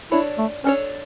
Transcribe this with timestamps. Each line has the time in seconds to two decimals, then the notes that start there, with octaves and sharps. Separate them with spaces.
0.12 D4 E4 A4 C#5
0.38 A3
0.64 C#4 D4 A4 C#5